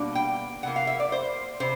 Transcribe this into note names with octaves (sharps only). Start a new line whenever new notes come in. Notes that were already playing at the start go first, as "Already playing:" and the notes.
Already playing: B2 G3 A#3 D4
G5
C3 F3 A#3 F#5
F5
E5
D5
C5
C3 C5